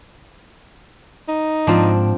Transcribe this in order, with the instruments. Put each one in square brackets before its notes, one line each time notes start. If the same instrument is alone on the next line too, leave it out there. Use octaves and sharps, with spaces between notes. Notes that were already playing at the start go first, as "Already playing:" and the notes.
[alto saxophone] D#4
[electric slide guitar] G#2 [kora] F3 C4 D4